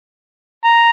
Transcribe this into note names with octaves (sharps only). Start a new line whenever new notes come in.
A#5